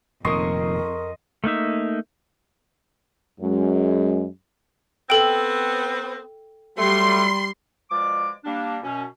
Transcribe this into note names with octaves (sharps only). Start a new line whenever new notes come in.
F1 F2 A#2 D#3 A#4 D#5 C6 C#6
A3 A#3 D#4 E5
F#2 G#3
B3 C4 A4 G5
F#3 G3 A3 C6
B2 F3 G#3 D5 D6
G3 A#3 D4
F#2 B2 C#4